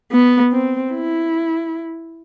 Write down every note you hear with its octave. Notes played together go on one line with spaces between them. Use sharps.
B3
C4
E4